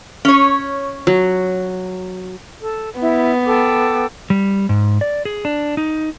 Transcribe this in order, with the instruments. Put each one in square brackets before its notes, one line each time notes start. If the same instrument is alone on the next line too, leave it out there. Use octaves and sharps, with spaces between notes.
[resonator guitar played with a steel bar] C#4 C#5
[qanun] F#3
[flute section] A4
[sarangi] B3 [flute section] E4
[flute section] A4 G5 D6
[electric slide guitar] G3
G#2
D5
G#4
D4
D#4